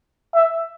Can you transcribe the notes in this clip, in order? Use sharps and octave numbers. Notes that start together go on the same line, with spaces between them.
E5